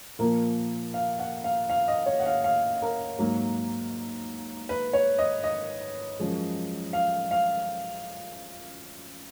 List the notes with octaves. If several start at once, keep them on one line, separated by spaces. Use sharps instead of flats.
A#2 F3 A#3 A#4
F5
F#5
F5
F5
D#5
C#5
F#5
F5
F5
A#4
G#2 F#3 A#3
B4
C#5
D#5
D#5
F#2 F3 G#3
F5
F5